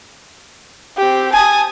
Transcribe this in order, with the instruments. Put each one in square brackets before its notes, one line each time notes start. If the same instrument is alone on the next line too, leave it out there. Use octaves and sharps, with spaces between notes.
[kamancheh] C4 G4
[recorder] G#5 [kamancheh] A5 D#6